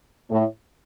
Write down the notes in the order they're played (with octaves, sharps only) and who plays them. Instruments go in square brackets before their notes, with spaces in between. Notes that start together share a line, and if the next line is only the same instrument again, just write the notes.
[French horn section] A2